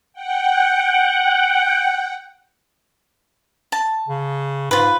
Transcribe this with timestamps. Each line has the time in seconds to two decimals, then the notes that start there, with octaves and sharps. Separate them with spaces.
0.13 F#5 G5
3.72 A5
4.08 C#3
4.71 G#2 F4 B4